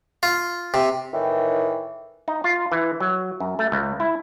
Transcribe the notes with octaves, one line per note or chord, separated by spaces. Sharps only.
F4
C3
A2 D#3 E3
D#4
F4
E3
F#3
F#2
A3
C#2
E4